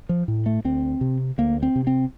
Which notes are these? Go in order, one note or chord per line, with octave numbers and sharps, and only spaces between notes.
F3
A2
A3
D2 C4
C3
D2 A#3
C4
C3
C4